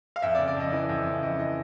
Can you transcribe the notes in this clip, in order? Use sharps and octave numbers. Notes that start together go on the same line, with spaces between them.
F5
F2 E5
D5
C#3
D5
F2 D#5
E3 D#5
F2
C#3
F2 D#5
E3 D#5